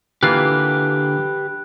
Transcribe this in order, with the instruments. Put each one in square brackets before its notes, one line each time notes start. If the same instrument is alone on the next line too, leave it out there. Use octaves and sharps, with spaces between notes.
[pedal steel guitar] D3 B5 [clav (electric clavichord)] E3 A#3 F4 [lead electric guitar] G4 B4 [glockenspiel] F#6